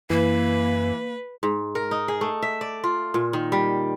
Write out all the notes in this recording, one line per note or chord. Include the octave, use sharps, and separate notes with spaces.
F#2 E3 A#3 B4
G#2
A#4
D#4
G#4
A3
E5
D5
F4
A#2
D#3
G3